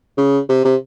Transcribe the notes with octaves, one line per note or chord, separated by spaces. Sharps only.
C#3
C3
C3